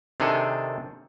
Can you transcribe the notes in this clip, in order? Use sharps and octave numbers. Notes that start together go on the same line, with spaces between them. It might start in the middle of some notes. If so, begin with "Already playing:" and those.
C3 D#3 D4 G#4 A4